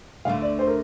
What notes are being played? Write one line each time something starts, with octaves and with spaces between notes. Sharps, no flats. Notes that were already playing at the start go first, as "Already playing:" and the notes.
D2 D3 A3 F5
D5
C5
A#4